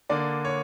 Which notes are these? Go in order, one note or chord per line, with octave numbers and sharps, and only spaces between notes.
D3 A#3 D4 D5
C#5